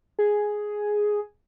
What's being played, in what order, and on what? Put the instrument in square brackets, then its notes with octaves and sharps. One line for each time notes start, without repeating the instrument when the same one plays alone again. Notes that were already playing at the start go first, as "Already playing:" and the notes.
[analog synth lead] G#4